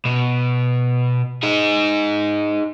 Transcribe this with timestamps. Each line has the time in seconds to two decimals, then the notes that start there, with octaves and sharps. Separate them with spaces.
0.05 B2
1.43 D#4 G#4